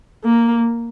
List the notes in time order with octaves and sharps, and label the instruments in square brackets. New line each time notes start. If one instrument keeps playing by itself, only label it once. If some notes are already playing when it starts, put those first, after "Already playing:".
[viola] A#3